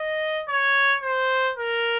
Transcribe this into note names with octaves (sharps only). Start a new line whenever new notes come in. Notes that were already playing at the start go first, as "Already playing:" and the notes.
Already playing: D#5
C#5
C5
A#4